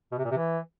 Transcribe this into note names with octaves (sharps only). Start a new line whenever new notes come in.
B2
C3
A#2
C3
E3